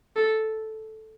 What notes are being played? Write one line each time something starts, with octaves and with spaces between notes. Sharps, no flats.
A4